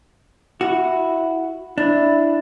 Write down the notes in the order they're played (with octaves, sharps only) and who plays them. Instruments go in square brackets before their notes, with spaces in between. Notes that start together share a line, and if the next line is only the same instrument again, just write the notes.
[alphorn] E4 [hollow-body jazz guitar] F#4
[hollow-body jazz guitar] D4 [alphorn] E4